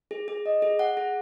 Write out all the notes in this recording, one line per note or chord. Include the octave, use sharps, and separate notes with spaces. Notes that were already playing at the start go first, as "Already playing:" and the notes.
G#4
G#4
D#5
G#4
F#5
G#4